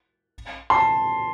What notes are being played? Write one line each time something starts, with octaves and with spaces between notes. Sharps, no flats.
A5 C6